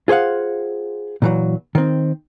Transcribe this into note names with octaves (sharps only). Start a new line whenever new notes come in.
F4 G#4 C5 F5 F#5
A#2 E3 F#3
D#3 C4